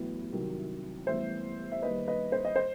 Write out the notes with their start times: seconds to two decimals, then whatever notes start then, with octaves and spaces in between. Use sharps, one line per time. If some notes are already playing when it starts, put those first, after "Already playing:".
Already playing: A1 A2 F#3 B3
0.33 C2 C3 D#3 F#3
1.07 A1 A2 G3 B3 C5 E5
1.72 E5
1.82 D#2 D#3 G3 B4 D#5
2.07 B4 D#5
2.32 C5
2.45 D#5
2.56 C5